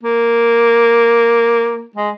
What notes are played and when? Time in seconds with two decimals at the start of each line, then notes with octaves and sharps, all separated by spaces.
0.04 A#3
1.96 G#3